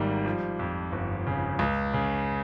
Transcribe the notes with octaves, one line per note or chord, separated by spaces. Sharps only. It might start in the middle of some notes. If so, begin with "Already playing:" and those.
Already playing: G#1 G#2 G3 A#3
F3
F2
G1
C#3
C#2
C#3